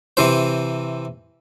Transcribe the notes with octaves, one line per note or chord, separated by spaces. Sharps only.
C3 E3 C5